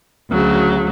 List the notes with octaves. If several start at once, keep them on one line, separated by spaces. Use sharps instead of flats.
D2 C#3 F#3